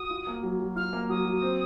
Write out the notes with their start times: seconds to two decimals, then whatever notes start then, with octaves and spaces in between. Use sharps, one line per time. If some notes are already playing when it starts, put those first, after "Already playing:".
Already playing: F#4 D#6
0.10 F4
0.27 A#3
0.43 F#3
0.60 F#3
0.76 F4 F6
0.93 A#3
1.10 F#3 D#6
1.25 F#3
1.42 C4